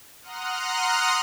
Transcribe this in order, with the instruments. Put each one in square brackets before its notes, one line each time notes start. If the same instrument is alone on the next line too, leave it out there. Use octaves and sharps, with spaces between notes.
[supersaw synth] F#5 A#5 C6 D#6 F6 F#6